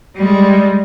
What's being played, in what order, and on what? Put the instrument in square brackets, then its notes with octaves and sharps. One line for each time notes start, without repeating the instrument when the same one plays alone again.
[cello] G3 G#3